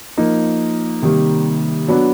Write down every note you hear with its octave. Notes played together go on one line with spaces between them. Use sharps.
F3 A#3 D#4
C3 D#3 G3 A#3
F#3 B3 D4